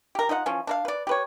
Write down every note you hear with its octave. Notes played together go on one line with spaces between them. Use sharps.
G4 A#4
D#4 F4 D#5 F#5
E3 F3 C#4
D4 A#4 F5
B4 D5
G4 B4 C#5